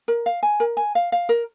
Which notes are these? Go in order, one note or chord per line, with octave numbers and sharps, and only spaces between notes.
A#4
F5
G#5
A#4
G#5
F5
F5
A#4